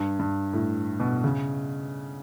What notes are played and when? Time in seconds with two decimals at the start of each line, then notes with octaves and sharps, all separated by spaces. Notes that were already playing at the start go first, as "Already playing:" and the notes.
Already playing: G2
0.19 G2
0.53 A2
1.00 B2
1.24 C#3